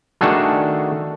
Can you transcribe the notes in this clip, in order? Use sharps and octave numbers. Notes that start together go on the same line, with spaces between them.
D#3 A3 D4 F#4 G#4 A4